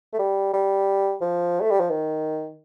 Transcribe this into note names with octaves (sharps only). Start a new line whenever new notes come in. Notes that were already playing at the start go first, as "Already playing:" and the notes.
A3
G3
G3
F3
A3
G3
F3
D#3